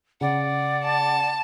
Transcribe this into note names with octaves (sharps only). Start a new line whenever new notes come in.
C#3 D5 F#5
A5